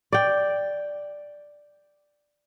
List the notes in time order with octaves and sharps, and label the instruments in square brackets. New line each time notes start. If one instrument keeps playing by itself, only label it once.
[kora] D5 G5